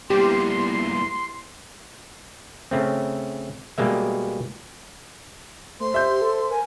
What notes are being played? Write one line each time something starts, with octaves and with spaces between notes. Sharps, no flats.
G2 A#2 B3 E4 G4 A#5 C6
C#3 A3 C4
B2 G3 G#3 A#3 E5
A3 C5 C6
G4 E5 G6
A4
A#4 G#5